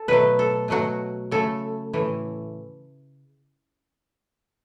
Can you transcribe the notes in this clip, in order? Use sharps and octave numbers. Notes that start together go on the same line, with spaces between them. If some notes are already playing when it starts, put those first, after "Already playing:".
Already playing: A4
B2 F#3 A3 B4
A4
B2 F#3 A3 F#4
C#3 A3 A4
A2 E3 A3